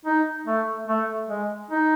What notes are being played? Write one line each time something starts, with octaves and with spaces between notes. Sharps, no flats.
D#4
A3
A3
G#3
D#4